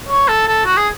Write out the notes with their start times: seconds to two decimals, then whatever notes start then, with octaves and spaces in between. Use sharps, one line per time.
0.09 C#5
0.28 A4
0.48 A4
0.65 F#4
0.77 G#4